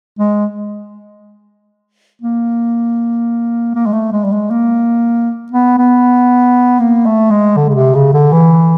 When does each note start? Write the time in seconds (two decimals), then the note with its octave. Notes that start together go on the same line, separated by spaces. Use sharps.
0.19 G#3
2.21 A#3
3.75 A#3
3.86 G#3
3.93 A3
4.12 G#3
4.24 G3
4.32 G#3
4.50 A#3
5.52 B3
5.78 B3
6.79 A#3
7.06 A3
7.31 G#3
7.57 D3
7.69 C#3
7.75 C3
7.94 C#3
8.13 D3
8.32 E3